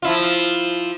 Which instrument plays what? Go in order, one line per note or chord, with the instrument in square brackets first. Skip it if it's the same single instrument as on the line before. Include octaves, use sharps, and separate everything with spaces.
[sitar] F3 E4 F4